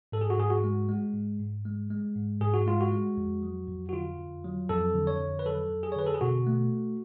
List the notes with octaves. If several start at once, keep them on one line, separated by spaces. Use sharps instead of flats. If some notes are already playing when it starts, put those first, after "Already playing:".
G#2 A4
G#4
F#4
G#2 G#4
F#4
G#3
G#3
G#2
G#2
G#3
G#3
G#2
G#2 G#4
F#4
G#3 F4
F#4
G#3
F2
F#3
F2
F#4
D3 F4
F2
F#3
F2 A4
D3
C#5
F2
B4
F#3 A4
F2
G#4
C#5
D3 B4
A4
G#4
B2 F#4
A3